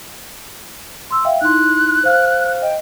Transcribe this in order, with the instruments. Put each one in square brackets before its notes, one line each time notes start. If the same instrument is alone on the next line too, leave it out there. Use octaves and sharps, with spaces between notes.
[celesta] C6 E6
E5 F5 G5
[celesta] D#4 E4 C6 [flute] F#6
[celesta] C5 F5 F6
[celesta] D#5 [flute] G5